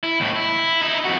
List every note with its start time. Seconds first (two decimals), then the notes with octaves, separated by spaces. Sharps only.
0.04 E4
0.20 D#2 A2
0.36 E4
0.81 D#4 E4
1.04 F2 F#4